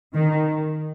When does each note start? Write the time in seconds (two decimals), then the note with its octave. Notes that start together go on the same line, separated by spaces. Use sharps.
0.14 D#3